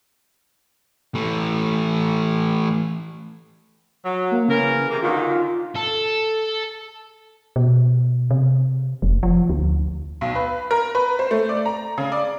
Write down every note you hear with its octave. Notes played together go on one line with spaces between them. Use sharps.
E3 A3
F#3
A#3
C#3 E3 A#4
C3 E3 A#3
F#2 D3 D#3 F4
A4
B2
C3
F1
F3
D2
B1
B4
A#4
B4
C5
A3
D5
A#5
C#3
D5